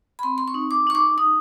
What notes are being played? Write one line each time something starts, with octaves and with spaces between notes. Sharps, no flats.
B5
C4 C6
C6
C#6
D#4
D6
D#4 C#6
D6
D#4 D#6